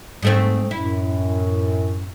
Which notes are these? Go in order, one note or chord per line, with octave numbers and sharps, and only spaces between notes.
G#2 A3 C4
F#2 A2 E4